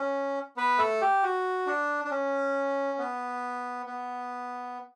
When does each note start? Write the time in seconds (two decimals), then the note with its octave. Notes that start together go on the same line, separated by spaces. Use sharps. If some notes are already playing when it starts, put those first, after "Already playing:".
Already playing: C#4
0.57 B3 B4
0.79 A3 A4
1.01 G4
1.23 F#4
1.66 D4
2.05 D4
2.11 C#4
2.98 B3
3.86 B3